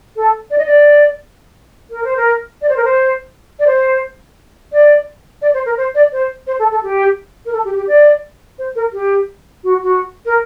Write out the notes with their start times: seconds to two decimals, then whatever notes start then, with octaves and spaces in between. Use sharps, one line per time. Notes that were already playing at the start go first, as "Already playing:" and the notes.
0.16 A4
0.51 D5
0.58 D#5
0.66 D5
1.91 A#4
2.04 C5
2.17 A#4
2.62 D5
2.69 C5
2.77 A#4
2.84 C5
3.59 D5
3.67 C5
4.72 D5
5.42 D5
5.54 C5
5.66 A#4
5.77 C5
5.95 D5
6.12 C5
6.47 C5
6.59 A4
6.71 A4
6.83 G4
7.46 A#4
7.53 A4
7.65 G4
7.76 G4
7.87 D5
8.59 C5
8.76 A#4
8.93 G4
9.64 F#4
9.83 F#4
10.26 A#4